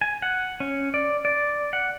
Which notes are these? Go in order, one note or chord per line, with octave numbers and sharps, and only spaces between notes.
G#5
F#5
C#4
D5
D5
F#5